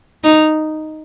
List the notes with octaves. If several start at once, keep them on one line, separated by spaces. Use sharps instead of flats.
D#4